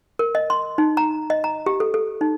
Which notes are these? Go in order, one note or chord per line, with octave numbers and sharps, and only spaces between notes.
A#4
D#5
C6
D#4
A#5
D#5
A#5
G4
A4
A4
D#4